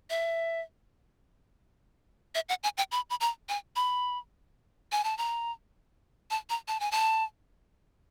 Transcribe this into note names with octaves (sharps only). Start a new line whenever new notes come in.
E5
E5
F#5
G#5
G5
B5
B5
A#5
G#5
B5
G#5
A5
A#5
A5
A#5
A5
G#5
A5